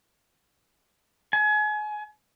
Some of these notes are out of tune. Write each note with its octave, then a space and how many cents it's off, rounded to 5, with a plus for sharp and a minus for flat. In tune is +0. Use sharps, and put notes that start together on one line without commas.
G#5 +30